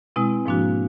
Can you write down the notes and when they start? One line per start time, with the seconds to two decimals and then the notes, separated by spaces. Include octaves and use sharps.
0.16 B2 G#3 C4 E4
0.46 G#2 F3 A#3 D4 F#4